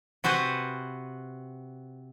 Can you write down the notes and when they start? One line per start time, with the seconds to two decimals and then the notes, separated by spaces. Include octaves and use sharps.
0.24 C3 F#4 B4 C5 G#5